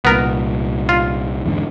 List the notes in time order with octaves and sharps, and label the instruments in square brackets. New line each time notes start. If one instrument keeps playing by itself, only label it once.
[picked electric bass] C2 A#2 [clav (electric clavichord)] B3 A#4
[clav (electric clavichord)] F4
[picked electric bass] E2 G#2 D3